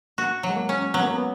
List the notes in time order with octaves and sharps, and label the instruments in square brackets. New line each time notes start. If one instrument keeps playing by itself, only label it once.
[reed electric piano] A#3 [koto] F#4
[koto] F#3
[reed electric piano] G#3
A#3
[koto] C#4
[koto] F#3 [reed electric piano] B3
[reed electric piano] A#3
B3